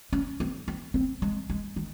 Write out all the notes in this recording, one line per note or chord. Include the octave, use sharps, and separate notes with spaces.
C#4
C4
C4
C4
G#3
G#3
D#3